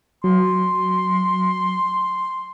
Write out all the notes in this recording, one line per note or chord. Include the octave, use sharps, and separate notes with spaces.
F#3 C6